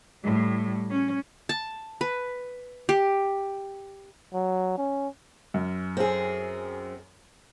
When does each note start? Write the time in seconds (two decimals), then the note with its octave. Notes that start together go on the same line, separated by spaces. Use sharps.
0.24 A2 G3
0.90 C#4
1.49 A5
2.01 B4
2.89 G4
4.34 F#3
4.78 C#4
5.54 F#2
5.97 C4 G#4